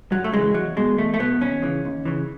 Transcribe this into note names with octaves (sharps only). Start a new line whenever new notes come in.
F#2 F#3
A3
C#3 E3 G#3
E2 F#3
B2 G#3
E2 A3
A3
B2 B3
D#2 C#4
C#3 E3
D#2
C#3 E3